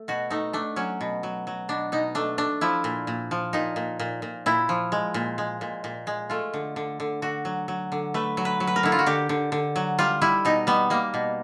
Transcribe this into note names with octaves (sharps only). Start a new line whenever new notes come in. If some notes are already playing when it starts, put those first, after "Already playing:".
Already playing: A3
B2 F#4
A3 D#4
A3 D4
F#3 C#4
B2
F#3
F#3
B2 D4
B2 D#4
A3 D4
A3 D4
F3 E4
A#2
A#2
F3
A#2 D#4
A#2
A#2
A#2
A#2 E4
F3
G#3
A#2
G#3
A#2
A#2
G#3
A3 F4
D3
D3
D3
D3 F#4
F#3
F#3
D3
A3 B4
F#3
B4
F#3
B4
A#4
D3 E4
F4
F#4
D3 G4
D3
D3
F#3
G3 F4
G3 E4
B2 D#4
G3 B3
G3 A#3
B2